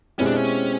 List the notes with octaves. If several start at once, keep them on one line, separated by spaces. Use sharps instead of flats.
B2 G#3 C4 C#4 E4 G4
D4
C#4